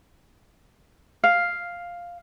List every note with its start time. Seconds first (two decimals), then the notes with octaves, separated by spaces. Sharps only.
1.24 F5